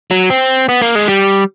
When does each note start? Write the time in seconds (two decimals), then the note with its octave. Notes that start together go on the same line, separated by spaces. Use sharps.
0.11 F#3
0.30 C4
0.69 B3
0.81 A#3
0.95 G#3
1.08 G3